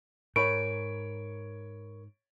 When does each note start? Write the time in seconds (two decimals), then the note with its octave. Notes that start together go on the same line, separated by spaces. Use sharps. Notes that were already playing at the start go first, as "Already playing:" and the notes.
0.36 G#2 A#4 C#5 B5 C#6 D7